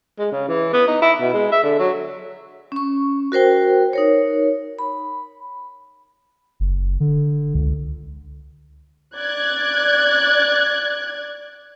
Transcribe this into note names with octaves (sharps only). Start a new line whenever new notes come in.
G#3
C#3
E3
B3
D#4
E4
B2
G#3
E5
D3
F#3
C#4 C#6
F#4 A#4 C5 G5
D#4 A#4 C#5
B5
F#1
D3
C#2
D5 F#6 G#6